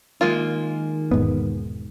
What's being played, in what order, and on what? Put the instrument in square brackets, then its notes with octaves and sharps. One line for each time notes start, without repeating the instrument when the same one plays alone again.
[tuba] D#3 [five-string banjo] G#3 A#3 F4
[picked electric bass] E1 G#2 B3